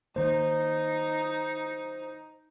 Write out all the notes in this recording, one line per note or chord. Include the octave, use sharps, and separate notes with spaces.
D#3 A#3 D#4 C5